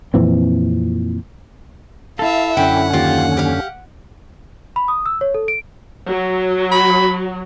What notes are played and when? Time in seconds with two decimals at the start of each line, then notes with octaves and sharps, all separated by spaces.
0.14 F2 A#2 E3 C4
2.19 E4 A4 E5 F5
2.57 F#2 D3 C#4 E4 G4 F#5
2.93 D#2 F4 G4
3.37 G4 F5
4.76 B5
4.88 D#6
5.06 E6
5.21 C#5
5.34 A4
5.48 D7
6.09 F#3
6.72 B5